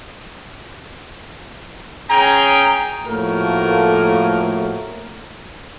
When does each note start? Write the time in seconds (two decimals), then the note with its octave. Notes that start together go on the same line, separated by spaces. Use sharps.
2.09 C#4 G#4 G5 A#5
3.06 A2 F3 A3 A#3 F#4 A#4